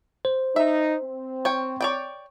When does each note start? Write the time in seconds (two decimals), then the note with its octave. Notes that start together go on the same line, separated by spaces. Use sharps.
0.25 C5
0.56 D#4 E5
1.03 C4
1.45 C#5 G5
1.81 C#5 D5 G5